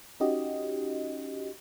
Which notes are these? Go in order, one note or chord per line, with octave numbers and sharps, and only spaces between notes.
C#4 D#4 F#4 G4 D#5